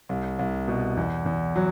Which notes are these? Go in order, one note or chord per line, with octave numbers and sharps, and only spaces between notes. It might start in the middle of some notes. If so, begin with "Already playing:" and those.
C2
C2
B2
E2
E2
F#3